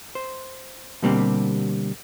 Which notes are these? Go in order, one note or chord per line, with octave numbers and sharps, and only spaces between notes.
C5
B2 D3 G3 A#3 C4 G4